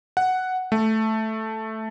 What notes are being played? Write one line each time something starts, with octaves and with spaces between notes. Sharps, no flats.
F#5
A3